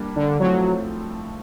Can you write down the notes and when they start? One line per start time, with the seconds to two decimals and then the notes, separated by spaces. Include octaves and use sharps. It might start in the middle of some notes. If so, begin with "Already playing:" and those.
Already playing: G3 A#3 D4
0.16 D3
0.40 F3 F#3 A3 C4 E4